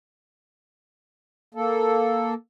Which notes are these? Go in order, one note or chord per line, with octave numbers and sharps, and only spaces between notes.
A#3 A4